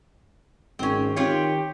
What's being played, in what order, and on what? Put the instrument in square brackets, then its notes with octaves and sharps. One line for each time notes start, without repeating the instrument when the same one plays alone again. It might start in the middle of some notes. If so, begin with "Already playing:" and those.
[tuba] G#1 [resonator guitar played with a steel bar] C4 C#4
[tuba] D#3 [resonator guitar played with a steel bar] C4 F4 C#5 [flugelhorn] G4